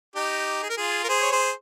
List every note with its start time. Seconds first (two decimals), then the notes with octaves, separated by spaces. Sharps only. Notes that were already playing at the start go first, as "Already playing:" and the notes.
0.15 D#4 G4
0.63 G#4
0.69 A#4
0.77 F4 G#4
1.04 A#4
1.09 G#4 C5
1.22 C#5
1.32 G#4 C5